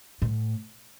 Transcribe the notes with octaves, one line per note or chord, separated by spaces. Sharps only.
A2